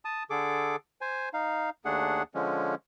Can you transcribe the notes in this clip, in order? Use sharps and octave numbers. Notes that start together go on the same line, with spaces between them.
A5 D#6
D3 G#4 A4 D6
C5 G#5
D#4 F5
D#2 A3 D4 G#4 F#5
D3 F3 G#3 C#4